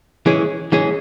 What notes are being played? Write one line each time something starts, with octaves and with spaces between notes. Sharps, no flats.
E3 G#3 C#4 G#4
E3 G#3 C#4 G#4